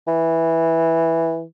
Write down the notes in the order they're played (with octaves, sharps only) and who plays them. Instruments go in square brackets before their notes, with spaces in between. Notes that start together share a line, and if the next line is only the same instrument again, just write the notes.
[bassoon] E3